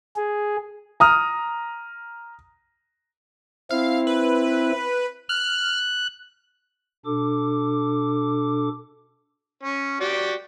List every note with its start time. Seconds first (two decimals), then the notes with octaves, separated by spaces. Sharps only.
0.16 G#4
1.00 A#5 D#6 F6
3.71 C4 E4 F5
4.07 B4
5.29 F6 F#6
7.05 B2 D4 A4 D6
9.63 C#4
10.01 F#4 G4 D5